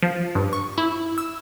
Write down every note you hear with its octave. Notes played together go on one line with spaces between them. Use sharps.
F3
G2
C#6
E4
E6